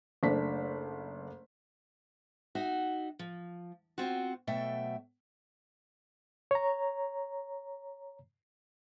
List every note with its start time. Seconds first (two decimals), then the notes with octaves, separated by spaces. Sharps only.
0.23 F#1 A3 D4 B6
2.55 D#4 F#4 E5
3.19 F3
3.98 C4 F4 F#4
4.47 B2 F#3 A3 E5 G5
6.51 C#5 A#5